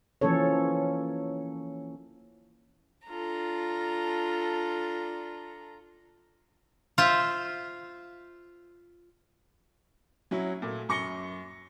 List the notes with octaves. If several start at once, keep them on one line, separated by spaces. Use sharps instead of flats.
E3 F3 A#3 C#4 A4 C#5
D4 F4 A4 A#5
F4 C5 E5
F#3 C#4 E4 F#4
A#2 A3
F#2 C#6 A#6 C#7 G7